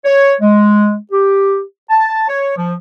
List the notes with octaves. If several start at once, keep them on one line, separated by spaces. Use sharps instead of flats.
C#5
G#3
G4
A5
C#5
F3